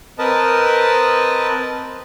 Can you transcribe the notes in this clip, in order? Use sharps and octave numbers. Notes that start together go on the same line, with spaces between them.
C4 A#4 B4 D#5 A5